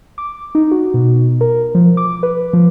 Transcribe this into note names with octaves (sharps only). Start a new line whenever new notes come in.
D6
D#4
F#4
B2
A#4
F3
D6
B4
F3